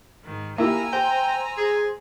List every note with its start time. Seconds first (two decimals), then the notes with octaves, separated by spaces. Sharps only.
0.24 G#2 D#3
0.58 A#3 E4 G4 G#5 A#5 E6
0.93 C5 G5
1.58 G#4